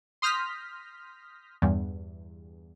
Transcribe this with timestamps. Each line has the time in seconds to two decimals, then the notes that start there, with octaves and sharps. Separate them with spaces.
0.22 C6 D#6 F6 G6 A#6 B6
1.62 E2 G2